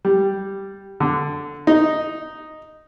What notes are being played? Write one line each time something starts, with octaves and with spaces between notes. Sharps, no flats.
G3
D3
D#4